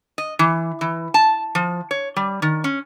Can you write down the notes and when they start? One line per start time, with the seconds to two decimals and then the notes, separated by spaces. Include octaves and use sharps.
0.18 D#5
0.39 E3
0.81 E3
1.14 A5
1.55 F3
1.91 C#5
2.16 G3
2.42 D#3
2.64 C#4